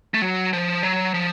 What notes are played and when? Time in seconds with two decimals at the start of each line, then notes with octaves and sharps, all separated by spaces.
0.14 A3
0.22 F#3
0.53 F3
0.83 F#3
1.14 F3